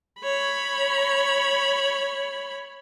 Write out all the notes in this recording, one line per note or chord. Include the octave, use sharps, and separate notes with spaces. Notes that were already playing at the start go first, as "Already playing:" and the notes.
C#5 B5